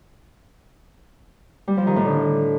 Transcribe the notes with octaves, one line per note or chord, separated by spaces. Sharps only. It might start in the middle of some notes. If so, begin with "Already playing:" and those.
G3
F3
D#3
A2
D3